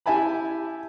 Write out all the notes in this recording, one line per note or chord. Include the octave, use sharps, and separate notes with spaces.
E4 G4 E5 G#5 A5 B5